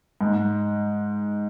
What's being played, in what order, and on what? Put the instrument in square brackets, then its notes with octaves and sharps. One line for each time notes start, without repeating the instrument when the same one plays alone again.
[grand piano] G#2